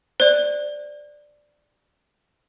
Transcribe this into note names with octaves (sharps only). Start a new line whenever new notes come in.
C5 D5